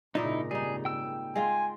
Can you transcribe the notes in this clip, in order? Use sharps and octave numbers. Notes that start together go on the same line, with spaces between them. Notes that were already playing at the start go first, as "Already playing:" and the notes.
G#1 A#2 C#3 D#4 E4 A#4 D#5
G3 D#4 G#4
G5 E6
G#3 F4 F5 G#5